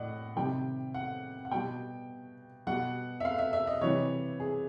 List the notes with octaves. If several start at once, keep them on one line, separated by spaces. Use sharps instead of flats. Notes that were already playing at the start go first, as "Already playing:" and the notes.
Already playing: A2 D5 D#5 F#5
C3 D#3 G3 G5
F#5
F#5
B2 G3 G5
B2 G3 F#5
E5
F5
E5
E5
D#5
C3 E3 G3 C#5
G#4